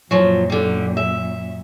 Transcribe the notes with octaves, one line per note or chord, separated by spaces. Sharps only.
F#2 A#2 F3 F#3
D3 G3
E5